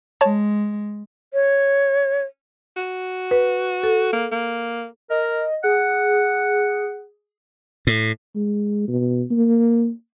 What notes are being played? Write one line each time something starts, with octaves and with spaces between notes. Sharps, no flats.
G#3 C#5 A5
C#5
F#4
B4
A4
A#3
A#3
A#4 D#5
G#4 F#5
A2
G#3
B2
A#3